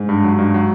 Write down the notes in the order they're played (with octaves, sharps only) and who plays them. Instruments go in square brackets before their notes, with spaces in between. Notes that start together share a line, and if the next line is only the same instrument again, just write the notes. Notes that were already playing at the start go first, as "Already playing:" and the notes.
Already playing: [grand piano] G#2
[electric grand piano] G2
F#3
G2
F#3